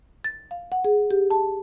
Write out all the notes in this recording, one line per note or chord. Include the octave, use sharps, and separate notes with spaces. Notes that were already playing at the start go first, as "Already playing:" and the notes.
A6
F5
F#5
G#4
G4
A5